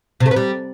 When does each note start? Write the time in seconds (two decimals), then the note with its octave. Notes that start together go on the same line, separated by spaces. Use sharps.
0.20 C3
0.26 A3
0.31 B3
0.36 G3